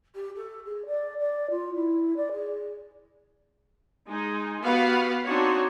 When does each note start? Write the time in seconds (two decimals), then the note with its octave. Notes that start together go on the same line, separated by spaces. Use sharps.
0.15 G4
0.36 A4
0.65 G#4
0.86 D5
1.19 D5
1.50 F4
1.75 E4
2.16 D5
2.32 G#4
4.07 G#3 D#4
4.62 B3 F#4 G4 B4 F5 F#5
5.24 C4 D4 D#4 F#4 C#5